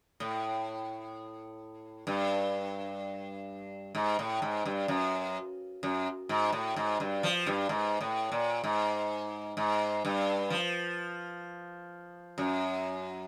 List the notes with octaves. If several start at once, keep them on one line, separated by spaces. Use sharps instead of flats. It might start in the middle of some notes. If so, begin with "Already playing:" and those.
A2
G2
G#2
A2
G#2
G2
F#2
F#2
G#2
A2
G#2
G2
F3
G2
G#2
A2
A#2
G#2
G#2
G2
F3
F#2